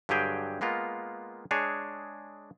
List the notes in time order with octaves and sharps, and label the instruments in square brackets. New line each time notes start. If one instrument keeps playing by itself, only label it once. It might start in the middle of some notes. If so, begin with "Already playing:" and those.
[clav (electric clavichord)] G2 D3 F#3 G4 G#4 G5
G#3 A#3 B3 F4
G#3 D4 G#4 C#5